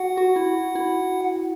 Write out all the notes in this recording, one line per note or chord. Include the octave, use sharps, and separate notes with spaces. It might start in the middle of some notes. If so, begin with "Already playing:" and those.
Already playing: F#4 F#5
F#4
E4
E4